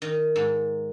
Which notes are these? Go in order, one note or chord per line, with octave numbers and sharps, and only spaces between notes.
D#3
G#2